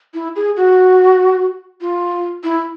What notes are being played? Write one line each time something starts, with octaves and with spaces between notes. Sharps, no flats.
E4
G#4
F#4
F4
E4